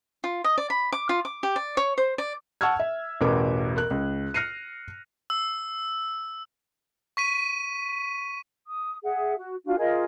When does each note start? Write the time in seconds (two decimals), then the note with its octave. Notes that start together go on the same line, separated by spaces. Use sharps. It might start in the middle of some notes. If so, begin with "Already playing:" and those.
0.24 F4
0.44 D#5
0.58 D5
0.70 B5
0.92 D6
1.09 F4
1.25 D6
1.43 G4
1.56 D5
1.77 C#5
1.98 C5
2.18 D5
2.61 F#5 A5 C#6 E6 F6 G#6
2.80 E5
3.21 A1 E2 B2 A#4 B4 D6
3.77 A#4 F#6
3.91 C#2
4.34 F6 F#6 A#6 C7 C#7 D#7
5.30 E6
7.17 C#6 B6 D#7
8.67 D#6
9.04 G#4 E5 F#5
9.37 F#4
9.65 D4 F4 F#4
9.78 F4 G#4 A#4 D#5